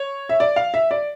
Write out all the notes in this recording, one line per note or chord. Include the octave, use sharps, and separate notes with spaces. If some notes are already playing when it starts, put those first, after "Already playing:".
Already playing: C#5
E5
D5
F5
E5
D5